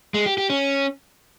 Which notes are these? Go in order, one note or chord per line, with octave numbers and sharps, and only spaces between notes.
G#3
G4
G4
C#4